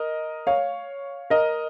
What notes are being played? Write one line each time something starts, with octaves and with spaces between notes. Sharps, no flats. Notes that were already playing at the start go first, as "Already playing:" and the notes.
Already playing: A#4 D#5
C#5 F5
A#4 D#5